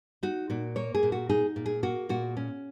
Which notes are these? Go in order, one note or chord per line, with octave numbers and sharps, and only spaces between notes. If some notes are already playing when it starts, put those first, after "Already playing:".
D#4 F#4
A#2 F#4
A#3 C#5
G#4
A#2
F#4
D#4 G#4
A#2
G#4
A#3 F#4
A#2 F#4
C#4